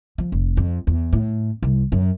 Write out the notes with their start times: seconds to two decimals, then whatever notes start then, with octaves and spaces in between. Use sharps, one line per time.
0.18 F3
0.32 F1
0.57 F2
0.87 E2
1.13 A2
1.62 C2
1.92 F#2